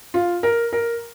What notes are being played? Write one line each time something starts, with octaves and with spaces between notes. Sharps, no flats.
F4
A#4
A#4